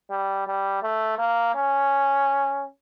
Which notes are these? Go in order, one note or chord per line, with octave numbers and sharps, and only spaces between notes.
G3
G3
A3
A#3
C#4